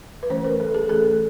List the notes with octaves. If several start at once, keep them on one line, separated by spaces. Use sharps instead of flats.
B4
E3 A3 C#4 C5
A#4
A4
G#4
E3 A3 C#4 A4